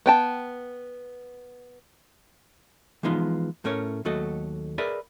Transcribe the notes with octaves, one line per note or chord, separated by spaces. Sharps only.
B3 G5 A5
E3 F3 G#3 B3 D#4 F4
A2 A3 C#4 A#4 C#5
D#2 F#3 A3 F#4 A4 D#5
G#4 A#4 B4 D5 E5